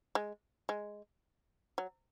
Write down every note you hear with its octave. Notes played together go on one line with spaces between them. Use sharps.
G#3
G#3
F#3